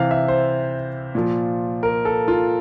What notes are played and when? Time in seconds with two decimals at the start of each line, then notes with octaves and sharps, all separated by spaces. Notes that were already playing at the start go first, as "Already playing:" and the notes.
Already playing: C3 E3 F5
0.11 E5
0.28 C5
1.15 A#2 F3
1.83 A#4
2.05 A4
2.28 F4